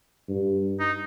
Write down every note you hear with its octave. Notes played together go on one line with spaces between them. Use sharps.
G2
D#4